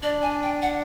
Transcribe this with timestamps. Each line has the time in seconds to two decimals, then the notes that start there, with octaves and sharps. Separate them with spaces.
0.02 D4 D5
0.22 G#5
0.43 G5
0.62 F#5